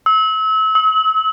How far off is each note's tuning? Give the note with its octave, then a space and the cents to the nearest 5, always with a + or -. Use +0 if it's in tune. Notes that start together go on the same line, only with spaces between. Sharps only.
E6 -30
E6 -45